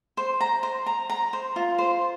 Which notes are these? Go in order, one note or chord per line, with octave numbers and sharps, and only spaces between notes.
C5
A#5
C5
A#5
A#5
C5
F4
C5